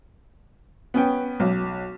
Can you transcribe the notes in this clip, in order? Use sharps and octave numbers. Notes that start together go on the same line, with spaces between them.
B3 C#4 G5
B1